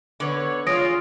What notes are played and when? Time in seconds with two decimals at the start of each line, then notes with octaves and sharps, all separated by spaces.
0.20 D3 B3 C#5
0.67 G#3 F4 C#5 D#6 A#6 D7